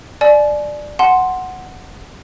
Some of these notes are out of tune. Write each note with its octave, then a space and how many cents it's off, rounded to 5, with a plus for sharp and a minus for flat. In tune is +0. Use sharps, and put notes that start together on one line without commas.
D5 +10 G#5 +40
F#5 +0 A5 -20 C6 +0